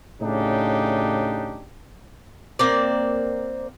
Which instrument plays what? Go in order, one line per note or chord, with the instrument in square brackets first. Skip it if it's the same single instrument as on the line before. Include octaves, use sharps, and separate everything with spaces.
[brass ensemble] A2 C#3 D4 D#4 G4
[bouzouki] A#3 C4 D5